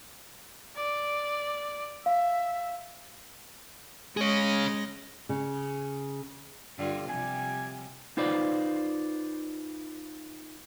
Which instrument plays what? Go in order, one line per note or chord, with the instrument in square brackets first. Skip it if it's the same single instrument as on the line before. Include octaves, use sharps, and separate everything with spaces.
[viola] D5
[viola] E5 [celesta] F5
[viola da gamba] G#3 C#4 D#5 [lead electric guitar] G#4 C#5
[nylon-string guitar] C#3
[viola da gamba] G2 D3 F4
[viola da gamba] C3 F3 G3 [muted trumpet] G#5
[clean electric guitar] D#4 F4 B4 C5 D5